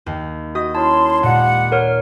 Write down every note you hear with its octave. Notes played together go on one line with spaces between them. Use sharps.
D#2
F#4 D#5 D#6
C#4 E4 A5 C6
A#2 G3 G#3 F#5
A#4 C#5 F6